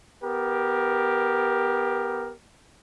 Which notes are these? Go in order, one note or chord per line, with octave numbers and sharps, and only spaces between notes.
B3 G4 A#4